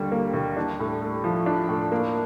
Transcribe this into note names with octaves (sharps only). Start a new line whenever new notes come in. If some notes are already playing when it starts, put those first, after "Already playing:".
Already playing: D#2 D3 G3
A#3
D#2
D4
A2
A3
F3
D4
A2
A#3